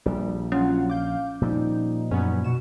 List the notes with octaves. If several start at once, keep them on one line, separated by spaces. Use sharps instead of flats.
A#1 G3
F#3 C#4 F4 F#5
F5 D6 G6
A#2 F3 G3 D#4
F#2 F#3 B3 C#4
B2 C#6 E7